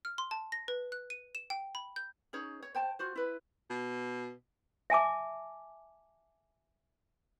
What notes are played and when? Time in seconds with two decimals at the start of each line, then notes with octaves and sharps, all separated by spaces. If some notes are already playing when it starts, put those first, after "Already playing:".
0.05 F6
0.18 C6
0.31 A5
0.52 A#6
0.68 B4
0.92 F#6
1.10 D#7
1.35 E7
1.50 G5
1.75 B5
1.96 G6
2.33 C#4 D#4 G#4 C#5
2.62 C#5
2.75 C5 G5 A5
2.99 F4 F#4 C5
3.16 E4 B4
3.70 B2
4.90 E5 G#5 A5 D6